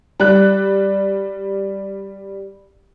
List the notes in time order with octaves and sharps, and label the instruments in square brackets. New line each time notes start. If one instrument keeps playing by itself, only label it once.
[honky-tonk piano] G3 F#6